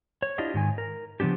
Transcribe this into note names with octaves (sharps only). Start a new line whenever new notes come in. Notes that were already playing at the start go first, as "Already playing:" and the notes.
C#5
D4 E4 F4 G4 D#5
G#2 D#3 G#5
A#4
C#3 F3 B3 D4 G4